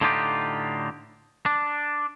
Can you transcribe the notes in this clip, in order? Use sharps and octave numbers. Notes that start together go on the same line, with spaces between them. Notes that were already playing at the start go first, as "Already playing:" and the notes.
A2 D3 D4 D#4 F4 G4
D4